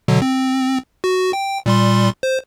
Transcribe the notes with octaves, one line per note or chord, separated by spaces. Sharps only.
B2 D3 F#3
C4
F#4
G5
A#2 G3 C6
C5